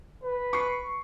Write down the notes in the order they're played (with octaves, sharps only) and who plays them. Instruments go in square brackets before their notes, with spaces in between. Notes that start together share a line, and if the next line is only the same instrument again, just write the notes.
[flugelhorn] B4
[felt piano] C#6 C7